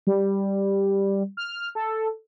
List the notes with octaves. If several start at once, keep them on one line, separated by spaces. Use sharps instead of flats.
G3
F6
A4